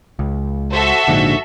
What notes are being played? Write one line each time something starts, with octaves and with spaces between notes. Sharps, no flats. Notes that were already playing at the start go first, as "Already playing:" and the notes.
C#2
F#4 A4 C5 E5
A#1 G#2 D3